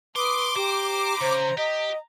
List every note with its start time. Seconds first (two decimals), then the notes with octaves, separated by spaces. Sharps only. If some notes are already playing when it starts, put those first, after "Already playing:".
0.16 B4 C6 D6 D#6
0.56 G4 C5 A#5
1.21 C#3 C5
1.58 G4 D#5